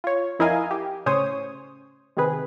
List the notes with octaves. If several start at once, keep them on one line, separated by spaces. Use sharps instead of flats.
F4 C#5
F2 E4 A#4 D#5 F5 G#5
G4
A2 C#3 C#4 C5 C#5 D#6
C3 D#3 C4 G#4 B4